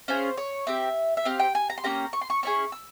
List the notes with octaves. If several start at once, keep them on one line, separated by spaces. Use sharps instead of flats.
C#4 F4 G#4 C5
C#5
C4 G4 E5
E5
C4 G4 F5
G5
G#5
A#5
C6
A#3 C#4 G4 A#5
C#6
C6
C#6
C#4 E4 G#4 C#6
E6